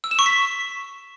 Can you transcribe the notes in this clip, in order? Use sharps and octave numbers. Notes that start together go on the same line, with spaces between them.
E6
E7
C#6
B6